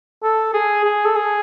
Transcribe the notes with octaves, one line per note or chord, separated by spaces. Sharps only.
A4
G#4
G#4
A4
G#4